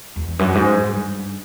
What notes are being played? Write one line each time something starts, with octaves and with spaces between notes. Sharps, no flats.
E2
F#2
G#2
G2